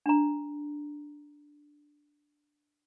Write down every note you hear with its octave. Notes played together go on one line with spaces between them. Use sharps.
D4 A#5